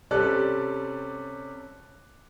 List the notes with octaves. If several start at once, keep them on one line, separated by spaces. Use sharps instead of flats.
C3 G3 C#4 A4 D5 F#6